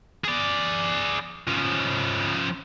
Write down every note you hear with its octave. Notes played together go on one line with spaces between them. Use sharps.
G#4 D5
F3 C#4